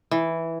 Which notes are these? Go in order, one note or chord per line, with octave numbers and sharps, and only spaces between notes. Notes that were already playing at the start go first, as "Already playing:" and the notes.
E3